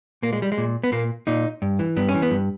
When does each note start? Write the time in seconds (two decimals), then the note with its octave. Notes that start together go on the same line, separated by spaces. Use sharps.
0.23 A#2 A#3
0.33 G#3
0.42 G3
0.52 G#3
0.58 A#2
0.84 B3
0.92 A#2 A#3
1.27 A#2 D#4
1.62 G2
1.79 E3
1.96 G2 B3
2.09 C#4
2.14 E3
2.22 B3
2.31 G2